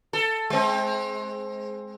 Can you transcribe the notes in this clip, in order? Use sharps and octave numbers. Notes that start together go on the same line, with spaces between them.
A4
G#3 C4